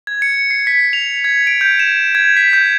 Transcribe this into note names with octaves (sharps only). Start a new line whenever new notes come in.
G#6
C#7
C7
B6
F7
G#6
D7
G6
E7
G#6
B6
G6